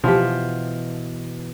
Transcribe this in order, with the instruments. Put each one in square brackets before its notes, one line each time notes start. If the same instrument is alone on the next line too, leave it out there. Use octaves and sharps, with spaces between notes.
[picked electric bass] B2 E3 [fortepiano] F3 G4